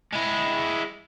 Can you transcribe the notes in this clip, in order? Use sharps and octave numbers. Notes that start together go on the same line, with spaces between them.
G#3 E4